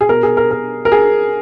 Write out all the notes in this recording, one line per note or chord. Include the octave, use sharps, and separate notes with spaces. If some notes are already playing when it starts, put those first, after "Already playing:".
G#4
B2 A#4
G#4
A#4
A#4
A#4
G#4